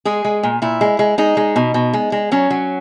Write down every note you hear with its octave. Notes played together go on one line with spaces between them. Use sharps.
G#3 G#4
G#3
A#2
A#2 E4
G#3
G#3
G#3 D#4
G#3
B2
B2
G#3
G#3
F#3 C#4
F#3